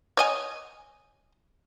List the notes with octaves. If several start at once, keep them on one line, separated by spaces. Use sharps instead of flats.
C#5 D#5 G#5